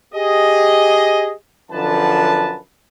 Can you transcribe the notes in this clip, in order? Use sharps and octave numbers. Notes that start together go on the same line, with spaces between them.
G4 G#4 D#5
F#2 D3 F3 B4 A5